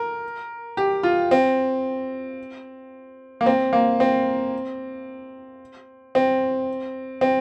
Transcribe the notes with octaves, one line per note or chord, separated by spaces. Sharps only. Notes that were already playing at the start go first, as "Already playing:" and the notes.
Already playing: A#4
G4
F4
C4
A#3
C4
A#3
C4
C4
C4